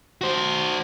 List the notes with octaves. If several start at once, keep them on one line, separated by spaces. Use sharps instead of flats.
F#4 C5